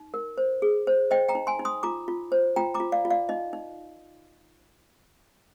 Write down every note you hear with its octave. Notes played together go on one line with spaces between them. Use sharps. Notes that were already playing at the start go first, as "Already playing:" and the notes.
Already playing: D#4
A#4
C5
G#4
C5
C5 D#5 G5
G5 A#5
D#4
G#5 C6
D#4
C6 D#6
F4 A#5 D6
F4
C5
F4 G5 A#5
A#5 D6
F4
D5 F5
F4
D5 F5
D#4 D#5
D#4